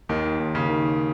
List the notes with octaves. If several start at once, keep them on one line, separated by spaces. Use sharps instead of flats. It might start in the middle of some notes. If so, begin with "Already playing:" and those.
D#2 D#3
D#2
C#3
D#3